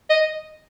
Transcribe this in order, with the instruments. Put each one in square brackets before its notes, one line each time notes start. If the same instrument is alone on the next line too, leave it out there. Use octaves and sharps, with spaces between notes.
[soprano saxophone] D#5